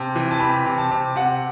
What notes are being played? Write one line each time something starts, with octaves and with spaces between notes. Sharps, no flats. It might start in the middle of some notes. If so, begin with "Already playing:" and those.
Already playing: C3 A5
E3
A5
C3 B5
C3
A5
C3
C3 F#5